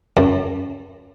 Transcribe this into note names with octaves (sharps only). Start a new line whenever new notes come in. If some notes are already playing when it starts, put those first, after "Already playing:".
F#2